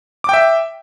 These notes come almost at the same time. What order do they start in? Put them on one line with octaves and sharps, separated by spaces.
D6 G5 E5